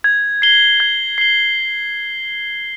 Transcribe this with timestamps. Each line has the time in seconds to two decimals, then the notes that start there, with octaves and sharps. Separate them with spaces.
0.04 G#6
0.42 C7 G7
0.80 G#6
1.18 C7 G7